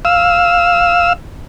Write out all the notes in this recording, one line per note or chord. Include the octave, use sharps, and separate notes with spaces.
F5 E6